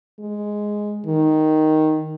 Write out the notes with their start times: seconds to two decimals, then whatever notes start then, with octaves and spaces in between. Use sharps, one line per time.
0.20 G#3
1.07 D#3